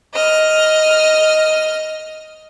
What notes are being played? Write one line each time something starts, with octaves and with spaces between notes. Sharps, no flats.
D#5 F6